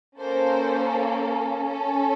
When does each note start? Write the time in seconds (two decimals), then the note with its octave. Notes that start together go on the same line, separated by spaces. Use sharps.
0.19 A#3 C#4 A4 C5
1.68 C#4 A4